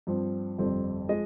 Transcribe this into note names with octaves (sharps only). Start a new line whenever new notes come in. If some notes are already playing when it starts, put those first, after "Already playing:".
G2 F3 C4
G1 F2 C3 G3 C4
F3 G#3 D#5